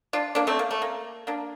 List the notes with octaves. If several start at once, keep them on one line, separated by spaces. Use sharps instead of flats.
D4 F4
A#3 D4
A3 C4
A#3
A3
A#3
A#3 D4